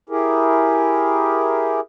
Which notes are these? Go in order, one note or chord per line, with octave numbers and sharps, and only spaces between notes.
E4 G4 G#4 A#4